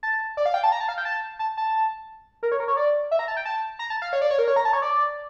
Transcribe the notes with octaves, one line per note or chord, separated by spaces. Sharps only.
A5
D5
F5
G5
A5
A#5
A5
F5
G5
A5
A5
A5
A#4
C#5
A#4
C#5
D5
E5
A#5
A5
G5
A5
A#5
A5
F5
C#5
D5
C#5
A#4
C#5
A#5
A5
C#5
D5